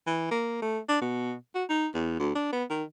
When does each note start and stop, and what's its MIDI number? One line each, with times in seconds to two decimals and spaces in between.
0.07 0.26 52
0.31 0.59 58
0.62 0.79 57
0.89 1.01 62
1.01 1.34 47
1.55 1.64 66
1.70 1.87 63
1.95 2.16 40
2.19 2.30 38
2.35 2.51 62
2.53 2.64 59
2.70 2.84 51